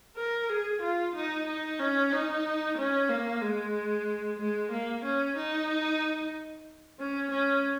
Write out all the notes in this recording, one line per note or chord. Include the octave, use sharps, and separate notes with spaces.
A#4
G#4
F4
D#4
D#4
C#4
D#4
C#4
A#3
G#3
G#3
A#3
C#4
D#4
C#4
C#4